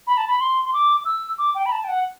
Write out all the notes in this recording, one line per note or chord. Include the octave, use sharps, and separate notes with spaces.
B5
A5
B5
C6
C6
D6
E6
D6
G5
B5
A5
G5
F#5